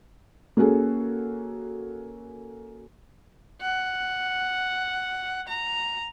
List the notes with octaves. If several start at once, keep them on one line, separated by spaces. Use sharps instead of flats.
A#3 C#4 F#4 G#4 A4
F#5
A#5